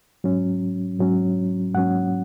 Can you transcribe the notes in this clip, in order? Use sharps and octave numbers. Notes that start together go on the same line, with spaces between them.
G#2 F#3 C#4
G#2 F#3 C#4
G#2 F#3 C#4 F#5